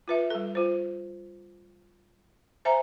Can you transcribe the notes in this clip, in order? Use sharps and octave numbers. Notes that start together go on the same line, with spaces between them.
F4 B4 E5
G3 A4
F4 C5
C5 E5 G#5 A#5